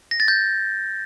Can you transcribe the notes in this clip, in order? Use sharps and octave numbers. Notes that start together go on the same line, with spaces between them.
A#6
A6
G6